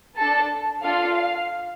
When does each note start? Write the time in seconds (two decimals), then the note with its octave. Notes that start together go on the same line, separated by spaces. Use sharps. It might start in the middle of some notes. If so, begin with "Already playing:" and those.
0.17 D4 A4 A5
0.82 D4 F4 A4 F5
1.14 F5